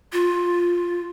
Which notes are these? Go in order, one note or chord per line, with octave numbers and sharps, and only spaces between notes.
F4